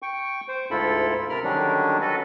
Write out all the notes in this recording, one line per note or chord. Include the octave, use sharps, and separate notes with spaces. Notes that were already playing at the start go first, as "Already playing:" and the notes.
G5 C#6
C5
D2 G#2 E4 F4 A4 B5
C3 A#4 B5 F6
D3 D#3 F#3 G3 C#4 D4
F#3 F#4 A4 B4